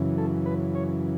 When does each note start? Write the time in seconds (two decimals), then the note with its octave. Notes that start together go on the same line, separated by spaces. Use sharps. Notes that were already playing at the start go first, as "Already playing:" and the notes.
Already playing: F#2 C#3 E3
0.18 A4
0.46 B4
0.75 C#5